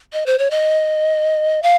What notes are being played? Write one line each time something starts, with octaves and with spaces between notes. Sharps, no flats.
D#5
C5
C#5
D#5
F5